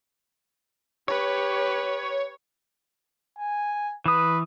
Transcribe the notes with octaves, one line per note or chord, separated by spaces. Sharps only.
G4 B4 C#5
G#5
E3 B4 D#6